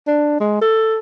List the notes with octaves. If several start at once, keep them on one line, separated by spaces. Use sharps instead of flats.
D4
G#3
A4